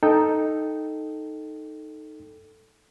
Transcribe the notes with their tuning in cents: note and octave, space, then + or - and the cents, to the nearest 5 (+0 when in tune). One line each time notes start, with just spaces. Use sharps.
D#4 +0 A4 +0 G5 +0